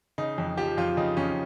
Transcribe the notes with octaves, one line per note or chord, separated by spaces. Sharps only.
C#3 D#4
F2
F3 G4
F2 F4
C#3 D#4
F2 C#4